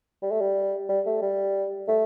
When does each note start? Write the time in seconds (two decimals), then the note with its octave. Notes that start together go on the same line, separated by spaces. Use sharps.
0.23 G3
0.31 A3
0.41 G3
0.89 G3
1.06 A3
1.22 G3
1.88 A3